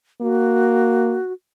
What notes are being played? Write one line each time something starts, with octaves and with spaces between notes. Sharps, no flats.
A#3 F#4